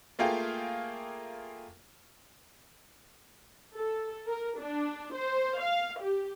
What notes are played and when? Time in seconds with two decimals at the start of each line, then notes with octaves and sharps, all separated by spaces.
0.19 A3 A#3 F4 G#4 F5 G5
3.75 A4
4.28 A#4
4.59 D4
5.15 C5
5.62 F5
6.02 G4